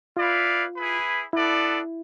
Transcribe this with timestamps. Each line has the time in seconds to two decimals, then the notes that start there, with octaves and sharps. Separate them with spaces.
0.17 E4 F4 B4 D5 F5
0.74 E4 G#4 B4
1.32 B3 D4 E4 A4 D5